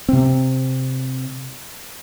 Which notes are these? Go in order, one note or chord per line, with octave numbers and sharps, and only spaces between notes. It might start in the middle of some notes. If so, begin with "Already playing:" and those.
C3 C4